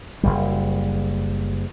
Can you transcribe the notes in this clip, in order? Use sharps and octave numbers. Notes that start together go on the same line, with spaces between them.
F#1 C2 G3